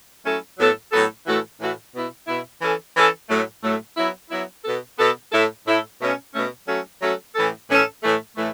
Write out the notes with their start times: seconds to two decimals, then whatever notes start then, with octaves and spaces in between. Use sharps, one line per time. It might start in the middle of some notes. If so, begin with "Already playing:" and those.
0.25 F#3 A3 C#4 E4 A4
0.59 A2 F#3 B3 A4
0.92 A2 F#3 B3 A4
1.26 A2 E3 A3 F#4 A4
1.60 A2 E3 A3 F#4 A4
1.94 B2 B3 E4
2.28 B2 B3 E4
2.61 E3 C#4 A4
2.96 E3 C#4 A4
3.29 A2 F#3 A3
3.63 A2 F#3 A3
3.97 F#3 B3 E4
4.31 F#3 B3 E4
4.65 B2 B3 A4
4.99 B2 B3 A4
5.32 A2 A3 E4 A4
5.66 A2 A3 E4 A4
6.00 B2 A3 C#4
6.33 B2 A3 C#4
6.67 F#3 A3 C#4 F#4 A4
7.01 F#3 A3 C#4 F#4 A4
7.35 A2 E3 C#4 A4
7.69 A2 E3 C#4 A4
8.03 A2 E3 A3
8.37 A2 E3 A3